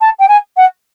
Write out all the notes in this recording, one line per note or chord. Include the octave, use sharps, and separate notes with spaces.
A5
G5
G#5
F#5